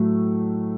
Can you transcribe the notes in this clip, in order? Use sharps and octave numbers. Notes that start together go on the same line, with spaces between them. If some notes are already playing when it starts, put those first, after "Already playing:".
Already playing: A2 F#3 A3